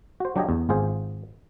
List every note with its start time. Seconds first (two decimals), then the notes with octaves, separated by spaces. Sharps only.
0.20 F#4 C5
0.36 F#3 D4 F#4 G4 C#5 D#5
0.49 E2
0.69 G#1 F4 G#4 C5